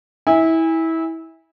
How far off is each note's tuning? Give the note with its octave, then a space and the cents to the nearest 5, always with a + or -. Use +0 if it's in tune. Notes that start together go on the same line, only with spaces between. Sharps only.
E4 -20 G#5 -30